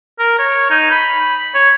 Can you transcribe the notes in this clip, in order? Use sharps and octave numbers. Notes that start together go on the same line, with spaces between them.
A#4
C#5
D#4
B5
C#5